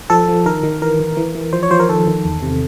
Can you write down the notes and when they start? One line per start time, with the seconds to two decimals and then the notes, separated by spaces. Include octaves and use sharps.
0.10 F3 A4
0.29 F3
0.46 D#3 A#4
0.63 D#3
0.82 E3 A#4
1.00 E3
1.17 E3
1.35 E3
1.53 F3 C5
1.63 C#5
1.71 F3 C5
1.80 A#4
1.89 D#3 A4
2.07 D#3
2.25 E2
2.43 C3